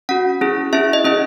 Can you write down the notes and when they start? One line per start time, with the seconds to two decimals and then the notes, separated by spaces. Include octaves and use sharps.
0.09 C#4 F#4 F#5
0.41 C#4 E4 G#4
0.73 C#4 E4 G#4 E5
0.93 D#5
1.04 C#4 E4 G#4 D#5